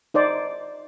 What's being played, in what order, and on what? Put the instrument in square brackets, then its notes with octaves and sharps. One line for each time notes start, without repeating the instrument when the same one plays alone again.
[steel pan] D#4 C5 D5